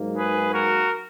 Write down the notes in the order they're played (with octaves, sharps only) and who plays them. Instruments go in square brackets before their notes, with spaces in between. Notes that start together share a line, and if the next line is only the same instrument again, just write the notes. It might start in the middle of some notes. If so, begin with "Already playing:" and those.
Already playing: [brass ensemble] G#2 F#3 A#3
G#4 B4
F#4 A#4